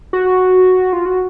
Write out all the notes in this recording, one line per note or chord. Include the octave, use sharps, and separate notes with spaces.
F#4
F4
F#4